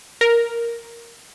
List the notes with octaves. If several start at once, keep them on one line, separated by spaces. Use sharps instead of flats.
A#4